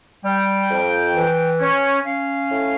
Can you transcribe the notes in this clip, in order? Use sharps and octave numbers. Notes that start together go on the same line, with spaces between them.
G3 G5
F2
E3
C#4
C#4 F5
A2